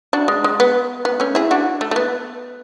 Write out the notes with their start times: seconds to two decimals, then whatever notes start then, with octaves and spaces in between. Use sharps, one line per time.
0.13 D4 F#4
0.28 G#3
0.44 G#3
0.60 B3
1.05 B3
1.20 A3 C#4
1.35 E4 G#4
1.51 D4 F#4
1.81 A3
1.91 A3
1.96 B3